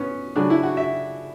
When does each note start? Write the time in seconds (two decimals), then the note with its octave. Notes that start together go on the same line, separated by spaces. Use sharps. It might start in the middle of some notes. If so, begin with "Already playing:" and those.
Already playing: B3 C#4
0.36 C#3 F#3 D4
0.50 E4
0.63 F#4
0.77 E5